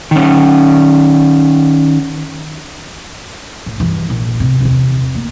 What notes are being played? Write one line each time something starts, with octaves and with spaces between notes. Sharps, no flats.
D#3 C#4
A1
G2 E3
A#1
C3
E2 C3
A#3